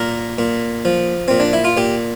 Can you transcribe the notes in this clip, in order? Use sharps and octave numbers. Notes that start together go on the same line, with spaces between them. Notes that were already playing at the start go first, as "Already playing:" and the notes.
Already playing: A#2 A#4
A#2
F3
A#2 C4
D4
E4
F4
A#2 G4